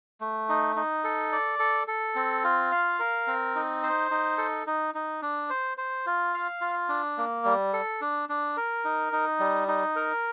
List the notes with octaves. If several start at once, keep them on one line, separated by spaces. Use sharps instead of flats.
A3
D#4
D#4
A4
D5
A4
A4
C4
F4
F5
A#4
C4
D#4
C5
D#4
A4
D#4
D#4
D4
C5
C5
F4
F5
F4
D4
A#3
G3
A4
D4
D4
A#4
D#4
D#4
G3
D#4
A#4